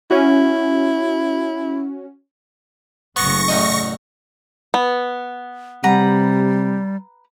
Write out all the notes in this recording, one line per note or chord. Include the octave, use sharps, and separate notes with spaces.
C#4 E4 F#4
F#1 C#3 A3 B3 C#6 A#6
A1 E2 D#5
B3
C3 G3 B4 F#5 A#5